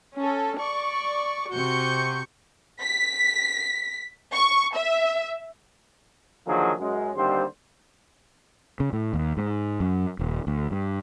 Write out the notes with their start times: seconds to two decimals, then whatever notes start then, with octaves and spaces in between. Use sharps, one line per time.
0.18 C#4 A4
0.57 D5 C#6
1.53 C3 F#4 C#6 G6 C#7
2.82 B6
4.34 C#6
4.76 E5
6.47 D3 D#3 F3 F#3 A#3 G#4
6.79 F#2 G#3
7.15 D#2 D3 G3 C4 C5
8.80 C#3
8.93 A2
9.13 D#2
9.37 G#2
9.80 F#2
10.19 D#1
10.47 D2
10.71 G2